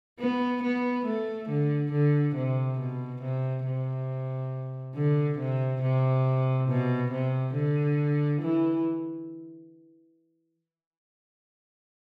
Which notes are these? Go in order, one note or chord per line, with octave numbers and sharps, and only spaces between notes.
B3
B3
A3
D3
D3
C3
B2
C3
C3
D3
C3
C3
B2
C3
D3
E3